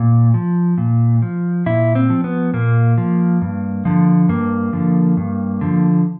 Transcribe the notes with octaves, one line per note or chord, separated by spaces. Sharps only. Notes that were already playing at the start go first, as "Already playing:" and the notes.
Already playing: A#2
F3
A#2
F3
A#2 E4
C4
F3
B3
A#2 A#3
F3
G2
D3 F3
G2 A#3
D3 F3
G2
D3 F3